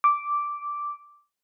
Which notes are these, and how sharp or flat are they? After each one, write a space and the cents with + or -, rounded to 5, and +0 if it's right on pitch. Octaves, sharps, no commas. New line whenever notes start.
D6 -5